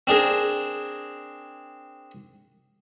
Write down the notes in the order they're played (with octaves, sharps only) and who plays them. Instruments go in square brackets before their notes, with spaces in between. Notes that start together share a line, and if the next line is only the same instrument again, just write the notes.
[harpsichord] C4 D4 G#4 A#4